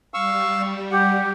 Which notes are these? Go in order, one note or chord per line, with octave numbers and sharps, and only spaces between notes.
G3 F5 C#6 E6
G4 F#5